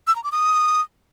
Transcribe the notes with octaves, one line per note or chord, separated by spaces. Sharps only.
E6
A#5
D6
D#6